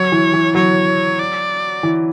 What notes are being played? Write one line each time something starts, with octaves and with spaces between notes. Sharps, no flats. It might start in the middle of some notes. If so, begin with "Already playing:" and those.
Already playing: F#3 C#5
E3
E3
F#3 C#5
D5
E3